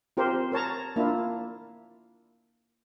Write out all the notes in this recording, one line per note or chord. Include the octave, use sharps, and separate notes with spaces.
C4 F4 G4 A#4 C5
A#4 C#5 A5 A#5
A#3 D4 E4 F4